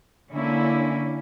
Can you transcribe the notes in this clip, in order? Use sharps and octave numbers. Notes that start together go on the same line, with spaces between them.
D3 A#3 C#4 E4